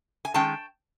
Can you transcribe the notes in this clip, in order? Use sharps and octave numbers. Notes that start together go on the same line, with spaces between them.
G#5
D#3 G#3 C#4 G5 A5